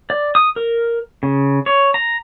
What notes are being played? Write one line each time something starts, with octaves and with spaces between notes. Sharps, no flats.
D5
D#6
A#4
C#3
C#5
A#5